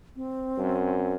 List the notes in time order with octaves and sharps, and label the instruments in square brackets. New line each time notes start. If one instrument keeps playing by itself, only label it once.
[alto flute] C4
[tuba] F#2